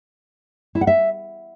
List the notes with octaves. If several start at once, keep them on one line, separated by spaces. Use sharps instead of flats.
E4
F#5
E5